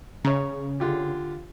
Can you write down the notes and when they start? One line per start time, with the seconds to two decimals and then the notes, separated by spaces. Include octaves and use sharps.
0.25 C#3 C#5 A#5
0.80 D3 F4 G4